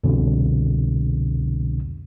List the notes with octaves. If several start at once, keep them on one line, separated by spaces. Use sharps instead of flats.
C2 F2 B2 D3